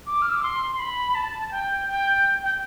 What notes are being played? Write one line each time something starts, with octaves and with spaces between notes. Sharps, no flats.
D6
F6
E6
D6
C6
C6
B5
A5
A5
G5
G5
G5